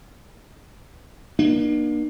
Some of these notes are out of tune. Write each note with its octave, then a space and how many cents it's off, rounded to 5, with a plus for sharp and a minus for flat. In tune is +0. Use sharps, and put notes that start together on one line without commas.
A#3 +40 D4 +40